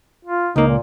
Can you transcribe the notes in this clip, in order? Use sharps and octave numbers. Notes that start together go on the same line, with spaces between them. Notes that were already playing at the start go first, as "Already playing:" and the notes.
F4
C#2 A#3 D#4
A#2